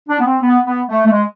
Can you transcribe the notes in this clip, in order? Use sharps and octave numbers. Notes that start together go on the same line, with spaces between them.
D4
B3
C4
B3
B3
A3
A3
G#3